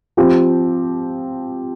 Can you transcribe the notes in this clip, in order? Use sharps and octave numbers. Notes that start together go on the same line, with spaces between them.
F3 C4 G4